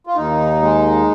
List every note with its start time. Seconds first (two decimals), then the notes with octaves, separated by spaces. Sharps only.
0.07 F4
0.16 D#2 D#4
0.62 G#3